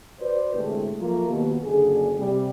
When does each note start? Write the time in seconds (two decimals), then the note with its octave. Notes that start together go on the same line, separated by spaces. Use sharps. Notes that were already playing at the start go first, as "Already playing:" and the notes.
0.20 F#4 B4 C5 D5
0.54 D2 A2 C3 G#3 A3
0.99 F3 F#3 A3 A#3 F4 A#4
1.28 D#2 B2
1.63 F#1 D3 G#4
2.17 C3 G3